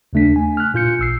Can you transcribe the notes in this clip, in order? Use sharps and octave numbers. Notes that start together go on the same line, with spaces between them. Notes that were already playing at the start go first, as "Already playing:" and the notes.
D#2 C#3 A3 D4 B6
G#5
F6 F#6
A#2 F4 G6 C#7
A1 E6 C7